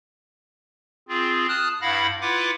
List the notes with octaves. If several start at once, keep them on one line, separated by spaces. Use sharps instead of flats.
C4 F4 G#4
A5 D#6 F6 F#6
G2 E4 F5 F#5 B5 A#6
E4 F4 B4 F#5 D6